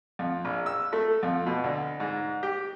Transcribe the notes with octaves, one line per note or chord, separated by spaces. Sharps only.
F2
A#1
E6
A3
F2
B2
D2
G#2
G4